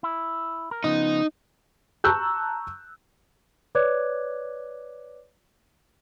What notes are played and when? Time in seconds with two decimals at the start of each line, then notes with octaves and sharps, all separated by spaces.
0.03 E4
0.71 A#4
0.84 C#3 F3 B3 D#4
2.04 A5 A#5 C#6 E6 F#6 G6
3.75 B4 C#5 D5 D6 F#6 G#6